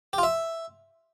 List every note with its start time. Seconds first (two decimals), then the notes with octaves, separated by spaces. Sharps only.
0.13 G4
0.18 F4
0.23 E5